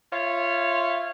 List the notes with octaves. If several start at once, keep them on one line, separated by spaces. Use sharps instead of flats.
F4 C#5 E5 F5